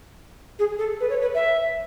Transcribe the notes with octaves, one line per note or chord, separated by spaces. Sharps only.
G#4
A4
B4
C#5
B4
E5